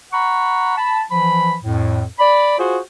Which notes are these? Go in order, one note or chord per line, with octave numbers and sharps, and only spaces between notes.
F#5 A#5 B5 C#6
A5 B5
E3 F3 B5
F2 A2
D5 B5
F4 F#4 G#4 C5